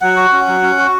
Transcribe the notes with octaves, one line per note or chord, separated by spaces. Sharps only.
F#3 F#5
F#4
C#4
F#3
C#4
F#4